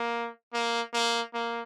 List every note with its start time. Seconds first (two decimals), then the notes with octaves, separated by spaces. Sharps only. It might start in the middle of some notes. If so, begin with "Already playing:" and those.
Already playing: A#3
0.53 A#3
0.94 A#3
1.34 A#3